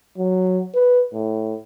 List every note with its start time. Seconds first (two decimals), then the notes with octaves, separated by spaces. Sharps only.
0.18 F#3
0.75 B4
1.14 A2